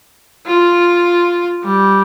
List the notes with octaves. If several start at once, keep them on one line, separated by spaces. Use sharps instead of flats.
F4
G3